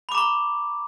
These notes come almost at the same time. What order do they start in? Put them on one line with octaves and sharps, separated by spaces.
B5 D6 A#5 C#6